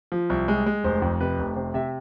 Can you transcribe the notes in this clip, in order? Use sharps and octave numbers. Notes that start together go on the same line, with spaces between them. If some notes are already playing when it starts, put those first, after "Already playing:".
F3
C2
G#3
G#3
F1 C5
F2
C3 B4
F1
C3 C5
C3 E5